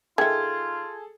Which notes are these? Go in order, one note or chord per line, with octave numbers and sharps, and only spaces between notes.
D#3 F4 G#4 A4 E5 G#6